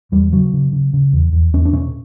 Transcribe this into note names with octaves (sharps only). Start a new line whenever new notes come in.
E2 G3
C#3 F#3
C#3
C#3
C#3
E2
E2
E2 C#4
D4
B2 C#4